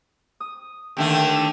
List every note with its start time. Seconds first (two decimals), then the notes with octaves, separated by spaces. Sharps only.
0.40 D#6
0.97 D#2 D3 A3 G5